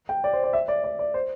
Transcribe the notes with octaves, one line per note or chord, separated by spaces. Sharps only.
G5
D5
C5
D5
E5
D5
D5
D5
C5